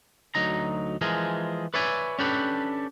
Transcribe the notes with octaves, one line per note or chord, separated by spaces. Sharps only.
D2 F#3 D#4 A#5
E3 F3 G#3 G#4 A#4
B4 C#5 D5 E5 G#5
C#4 D4 G4 A4 B4